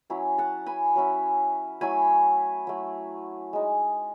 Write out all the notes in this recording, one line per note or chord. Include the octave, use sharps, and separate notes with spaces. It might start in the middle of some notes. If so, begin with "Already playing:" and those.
F#3 C#4 E4
F#5 A5
G#5 B5
F#3 C#4 E4
F#3 A3 E4 G#5 B5
F#3 A3 E4
G#3 D#4